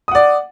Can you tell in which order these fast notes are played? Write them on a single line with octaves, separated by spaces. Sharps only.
D#6 F#5 D5